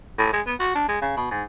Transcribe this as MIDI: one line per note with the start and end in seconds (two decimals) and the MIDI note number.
0.18 0.33 45
0.33 0.41 56
0.47 0.54 59
0.60 0.72 66
0.75 0.84 62
0.89 0.99 56
1.02 1.14 49
1.17 1.29 47
1.31 1.43 44